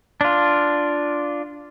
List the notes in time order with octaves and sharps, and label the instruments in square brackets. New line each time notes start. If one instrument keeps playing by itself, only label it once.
[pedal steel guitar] D4 F4